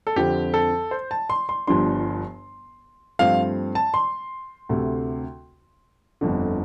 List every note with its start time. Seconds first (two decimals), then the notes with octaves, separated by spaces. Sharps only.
0.07 A4
0.16 F2 D3 F3 C4 G4
0.54 A4
0.91 C5
1.11 A5
1.30 C6
1.49 C6
1.67 G1 G2 F3 D4 C6
3.19 G2 F3 A3 C4 F5
3.75 A5
3.94 C6
4.69 D2 C3 A3
6.21 G1 F2 D3